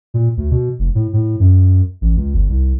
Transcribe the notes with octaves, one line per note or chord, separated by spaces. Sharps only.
A#2
D2
B2
F1
A2
A2
F#2
A1
C#2
G1
C2